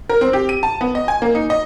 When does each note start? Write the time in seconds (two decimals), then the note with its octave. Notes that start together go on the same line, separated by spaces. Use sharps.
0.09 A#4
0.21 C4
0.33 G4
0.49 D#7
0.63 A5
0.81 B3
0.95 D#5
1.08 G#5
1.22 A#3
1.35 D#4
1.50 D#5